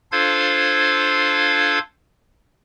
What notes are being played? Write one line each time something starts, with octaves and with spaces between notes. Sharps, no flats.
D4 F4 A4 C5 F5 G#6